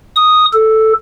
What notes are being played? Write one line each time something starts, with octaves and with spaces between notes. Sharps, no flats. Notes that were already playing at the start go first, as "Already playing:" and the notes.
D#6
A4